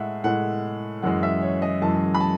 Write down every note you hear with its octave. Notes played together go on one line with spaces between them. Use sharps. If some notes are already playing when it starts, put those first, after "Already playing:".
Already playing: A2 G#3 E5 F#5
A2 G#3 F#5
F#2 E3 G#3 F#5
E5
C#5
D#5
F#2 E3 G#3 A5
B5
A5